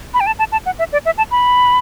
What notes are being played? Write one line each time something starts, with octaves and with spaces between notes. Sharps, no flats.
B5
G5
A5
A5
A5
F#5
E5
D5
E5
A5
B5